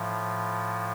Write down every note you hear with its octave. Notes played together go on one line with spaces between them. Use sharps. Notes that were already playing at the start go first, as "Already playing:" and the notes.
Already playing: A2 F3